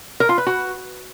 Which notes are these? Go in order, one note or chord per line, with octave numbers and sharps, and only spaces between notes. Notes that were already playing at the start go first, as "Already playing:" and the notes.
A#4
F4
B4
F#4